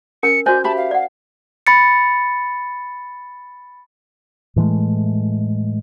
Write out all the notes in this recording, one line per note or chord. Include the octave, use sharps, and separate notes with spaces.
C#4 A#4 G#5 C#7
F#4 C5 D5 D#5 G#5 G6
G4 E5 A5 B5
F5
D5 F#5
B5 A6 C#7
A2 E3 G#3 A3